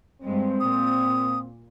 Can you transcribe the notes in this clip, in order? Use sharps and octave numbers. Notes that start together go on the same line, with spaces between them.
G2 G3 G#3 C4
A#2 D#6